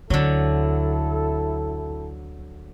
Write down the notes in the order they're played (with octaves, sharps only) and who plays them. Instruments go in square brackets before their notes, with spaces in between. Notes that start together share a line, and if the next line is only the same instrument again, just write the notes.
[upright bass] D2 [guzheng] D3 F#3 [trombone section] E4 A4